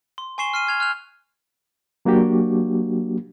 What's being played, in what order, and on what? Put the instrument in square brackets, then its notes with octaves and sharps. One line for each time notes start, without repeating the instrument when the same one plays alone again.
[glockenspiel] C6
G#5 C6 C#6 C7 E7 G7
F6 C7 D#7
F6 G#6 F7
F6 F#6 F7
[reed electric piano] F#3 A#3 D4 F#4 G4